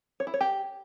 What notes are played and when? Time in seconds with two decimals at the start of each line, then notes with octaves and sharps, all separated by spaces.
0.20 C#5
0.27 E4
0.34 C#5
0.41 G4